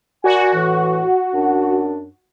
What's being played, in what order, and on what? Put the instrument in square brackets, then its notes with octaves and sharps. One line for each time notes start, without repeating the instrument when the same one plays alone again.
[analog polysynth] F#4 [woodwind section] A#4 D5 G#5
[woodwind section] A2 E3
F#2 D4